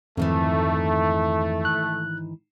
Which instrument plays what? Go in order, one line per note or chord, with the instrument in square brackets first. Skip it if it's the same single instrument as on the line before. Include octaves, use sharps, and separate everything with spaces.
[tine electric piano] F2 [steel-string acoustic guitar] G#2 D#3 E3 [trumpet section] A3
[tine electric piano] F#6